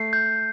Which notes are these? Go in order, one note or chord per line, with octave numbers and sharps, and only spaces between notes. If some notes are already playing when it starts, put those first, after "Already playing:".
Already playing: A3 C7
G6